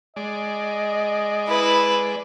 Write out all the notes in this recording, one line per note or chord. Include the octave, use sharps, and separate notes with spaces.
G#3 D5 D#5
E4 B4